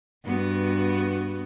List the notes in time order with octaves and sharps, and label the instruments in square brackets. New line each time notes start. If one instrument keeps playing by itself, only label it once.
[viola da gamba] G2 B3 F#4